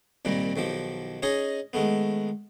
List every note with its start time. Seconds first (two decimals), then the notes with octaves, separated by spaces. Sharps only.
0.25 C2 A#2 D#3 G3
0.56 B1 D#3 F3 G4
1.22 C#4 D#4 G#4 C#5 D#5 A#5
1.73 D#3 G#3 A3 B3